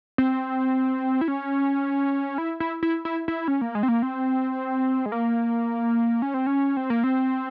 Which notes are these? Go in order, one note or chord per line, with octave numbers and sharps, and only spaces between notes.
C4
E4
C#4
E4
E4
E4
E4
E4
C#4
A#3
G#3
C4
A#3
C4
G#3
A#3
C#4
C4
C#4
C4
A#3
C4